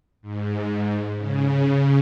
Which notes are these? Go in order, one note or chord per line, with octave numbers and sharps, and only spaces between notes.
G#2
C#3